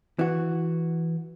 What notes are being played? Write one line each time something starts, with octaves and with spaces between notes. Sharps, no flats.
E3 F#4